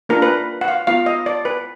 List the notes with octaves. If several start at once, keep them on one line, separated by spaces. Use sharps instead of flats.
A#3 D4 F4 A#4
B4
F#5
F5
B3 F4 F5
D#5
D5
B4